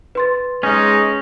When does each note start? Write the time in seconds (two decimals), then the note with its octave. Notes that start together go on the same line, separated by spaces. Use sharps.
0.15 B4 C6 A6
0.63 G#3 C#4 D#4